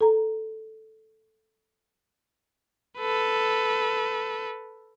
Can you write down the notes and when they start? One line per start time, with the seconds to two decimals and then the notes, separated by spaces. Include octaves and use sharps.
0.01 A4 A#5
2.99 A4 B4